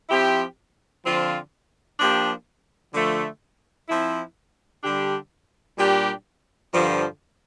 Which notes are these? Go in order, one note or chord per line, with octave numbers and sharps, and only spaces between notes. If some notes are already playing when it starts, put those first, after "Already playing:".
F3 C4 E4 G4
D3 F3 C4 F4
F3 A#3 D4 G4
D3 F3 A3
F3 C4 E4
D3 G3 D4 G4
A#2 G3 D4 G4
G2 D3 F3